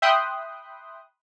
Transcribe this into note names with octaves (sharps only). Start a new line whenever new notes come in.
E5 G5 B5 C6 D#6 F#6